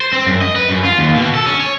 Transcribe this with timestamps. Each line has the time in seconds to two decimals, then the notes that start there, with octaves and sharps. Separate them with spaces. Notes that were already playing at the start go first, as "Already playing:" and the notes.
0.01 C5
0.13 C4
0.26 F#2
0.41 D#5
0.56 B4
0.68 F#2
0.85 F4
0.98 D#2
1.16 B2
1.35 A4
1.47 C#4
1.60 C#5